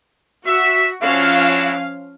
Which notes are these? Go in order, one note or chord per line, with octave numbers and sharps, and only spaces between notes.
F#4 E5
F3 C#4 D4 E4 F#4 F5